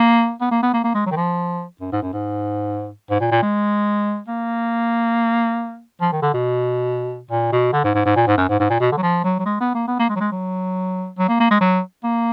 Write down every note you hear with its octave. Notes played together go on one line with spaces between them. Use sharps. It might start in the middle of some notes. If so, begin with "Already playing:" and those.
Already playing: A#3
B3
A#3
B3
A#3
A#3
G#3
F#3
D#3
F3
F#2
G#2
F#2
G#2
G#2
A#2
A#2
G#3
A#3
F3
D#3
D3
B2
A#2
B2
D3
G#2
G#2
G#2
A#2
G#2
F#2
G#2
G#2
A#2
B2
D3
F#3
F3
F#3
F#3
G#3
B3
A#3
B3
A#3
G#3
F#3
G#3
F#3
F#3
A#3
A#3
G#3
F#3
A#3